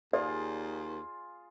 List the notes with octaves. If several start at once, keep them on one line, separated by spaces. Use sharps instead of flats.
D#2 F4 G#4 D5